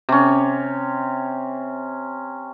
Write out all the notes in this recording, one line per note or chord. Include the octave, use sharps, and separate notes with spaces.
C3 C#4